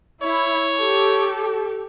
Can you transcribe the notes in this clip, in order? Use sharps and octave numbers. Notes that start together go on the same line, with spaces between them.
E4 C#5
G4 A4